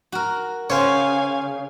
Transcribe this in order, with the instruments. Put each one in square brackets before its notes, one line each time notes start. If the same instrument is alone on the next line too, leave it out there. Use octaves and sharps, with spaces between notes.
[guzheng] F#4 A#4
[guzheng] C#3 [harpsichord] C5 C#5 [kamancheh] F5 G#5